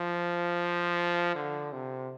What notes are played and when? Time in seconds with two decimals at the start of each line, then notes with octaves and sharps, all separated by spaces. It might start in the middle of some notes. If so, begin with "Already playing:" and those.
Already playing: F3
1.35 D3
1.73 C3